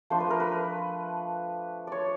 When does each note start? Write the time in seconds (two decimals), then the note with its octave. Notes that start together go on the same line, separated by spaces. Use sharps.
0.10 F3 A3 D4 C5
0.20 B4
0.30 A#4
0.40 B4
1.87 C#5 D5